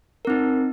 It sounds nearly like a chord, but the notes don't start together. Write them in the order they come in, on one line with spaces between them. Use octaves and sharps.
A#4 C4 D#4